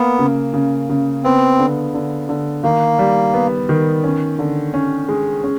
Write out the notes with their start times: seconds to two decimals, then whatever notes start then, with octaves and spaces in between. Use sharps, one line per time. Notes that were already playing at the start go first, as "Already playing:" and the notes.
Already playing: A#3 B3
0.19 C#3
0.54 C#3
0.89 C#3
1.24 B3 C4
1.59 D3
1.94 D3
2.29 D3
2.63 D#3 A#3
2.99 G3
3.34 B3
3.69 D#3
4.04 C#4
4.39 D3
4.74 C#4
5.09 G#3
5.44 C#4